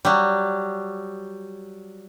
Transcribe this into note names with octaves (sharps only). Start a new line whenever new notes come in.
F#3 G3